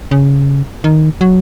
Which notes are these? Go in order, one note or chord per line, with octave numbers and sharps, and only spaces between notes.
C#3
D#3
F#3